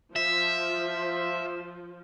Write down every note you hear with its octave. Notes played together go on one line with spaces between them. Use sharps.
F3 E5